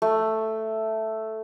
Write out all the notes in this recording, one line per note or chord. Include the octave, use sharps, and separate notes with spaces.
A3